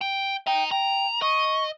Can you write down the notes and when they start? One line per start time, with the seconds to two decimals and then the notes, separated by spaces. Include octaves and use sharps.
0.01 G5
0.47 D#5 G5 A#5
0.71 G5 A#5
1.22 D#5 C#6